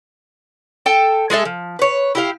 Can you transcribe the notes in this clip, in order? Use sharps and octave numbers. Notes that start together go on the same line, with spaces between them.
A4 G5 A5
G#3 G#4 A4 E5
F3
B4 C#5
E4 G4 F5